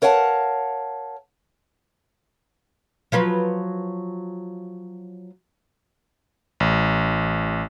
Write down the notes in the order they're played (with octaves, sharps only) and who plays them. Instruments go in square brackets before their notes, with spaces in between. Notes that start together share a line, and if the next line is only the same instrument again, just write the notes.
[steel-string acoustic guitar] A#4 C#5 F5 F#5 G#5 A5
[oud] F3 F#3 B4
[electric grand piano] A1